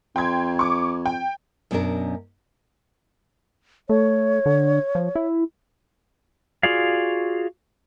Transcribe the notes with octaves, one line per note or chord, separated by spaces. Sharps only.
F2 G5 C6 G#6
C#6 D6
G5
F#2 B2 C#4 D4 A#4
A3 C#5
D3
F3
E4
F4 F#4 G#4 D5 F5